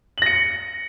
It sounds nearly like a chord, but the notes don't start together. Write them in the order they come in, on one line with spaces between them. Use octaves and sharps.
F#7 A#6 C#7